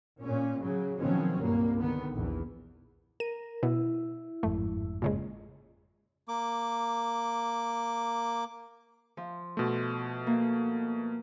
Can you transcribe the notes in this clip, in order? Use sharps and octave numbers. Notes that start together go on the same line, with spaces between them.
A#2 C#4
C#3 F#3
B2 D#3 F3 F#3 C4 C#4
C2 G2 A#2 A#3
D3 D#3 B3
A#1 E2
A#4 D#7
B2 E4
G1 F2 G#2 A3
A#2 C#3 G#3
A#3 D6
F3
B2 A3
A#3